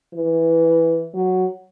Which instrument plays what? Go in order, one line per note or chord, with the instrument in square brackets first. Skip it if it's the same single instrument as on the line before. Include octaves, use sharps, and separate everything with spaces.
[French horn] E3
F#3